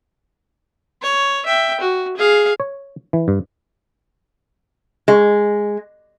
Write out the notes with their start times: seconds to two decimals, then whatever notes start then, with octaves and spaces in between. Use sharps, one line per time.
1.02 C#5
1.46 E5 G5
1.80 F#4
2.17 G#4 F5
2.60 C#5
3.13 E3
3.28 G2
5.08 G#3